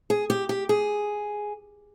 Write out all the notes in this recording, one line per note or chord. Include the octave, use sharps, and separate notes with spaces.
G#4
G4
G4
G#4